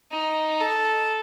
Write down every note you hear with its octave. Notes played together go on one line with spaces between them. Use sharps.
D#4
A4